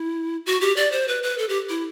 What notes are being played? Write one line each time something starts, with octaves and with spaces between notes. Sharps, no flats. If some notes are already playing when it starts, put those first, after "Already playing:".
Already playing: E4
F#4
G4
D5
C5
B4
B4
A4
G4
E4